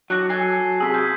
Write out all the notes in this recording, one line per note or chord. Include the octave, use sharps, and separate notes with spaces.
F#3 D4 F#4
A4 G#5 C7
C3 G#4 E6 B6
C#4 G6 G#6 B6